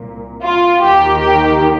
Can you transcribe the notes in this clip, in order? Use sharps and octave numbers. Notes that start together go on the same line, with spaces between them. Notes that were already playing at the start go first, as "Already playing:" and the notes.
Already playing: C2 A#2
F4
D#2 D#3 G4
G4